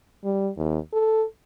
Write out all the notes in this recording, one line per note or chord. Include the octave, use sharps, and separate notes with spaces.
G3
D#2
A4